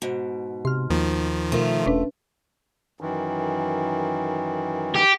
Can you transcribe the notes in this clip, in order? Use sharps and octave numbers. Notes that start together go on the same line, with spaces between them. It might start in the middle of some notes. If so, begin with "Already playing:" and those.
G#2 B2
C3 C6 F6
D#2 D#3 F3
B2 A3 F4 A#4
E1 C#4 D4 B4
F#2 D#3 E3
G4